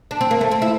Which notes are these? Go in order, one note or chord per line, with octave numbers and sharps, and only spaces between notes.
D4
C4
A#3
A3
C4
E4